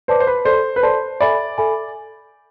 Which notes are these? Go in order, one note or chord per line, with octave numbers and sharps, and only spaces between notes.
B4 C5 D5 A5 D6
C5
B4
A4 C5 D5 A5 C6
B4
A4 C5 D5 A5 C6
A4 D5 E5 G#5 B5
A4 E5 G#5 B5